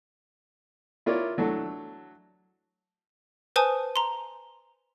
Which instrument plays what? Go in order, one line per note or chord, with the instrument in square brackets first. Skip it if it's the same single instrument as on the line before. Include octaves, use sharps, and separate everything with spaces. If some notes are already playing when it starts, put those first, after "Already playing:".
[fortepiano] E4 F4 A#4 C#5 D5 E5
E3 F#3 A3 D4 A4
[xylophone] B4 C5 G#5 A5 D#6
A#5 C6